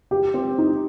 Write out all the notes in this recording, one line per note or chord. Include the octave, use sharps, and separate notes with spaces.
G4
C4
D#4